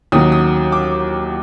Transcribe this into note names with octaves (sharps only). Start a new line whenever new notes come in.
D#2 D#3 F#3 D#6
D#6
D6